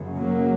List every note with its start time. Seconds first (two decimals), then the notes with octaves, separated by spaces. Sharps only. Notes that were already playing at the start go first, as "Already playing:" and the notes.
Already playing: F#1 F#2 C#3
0.17 F#3 A#3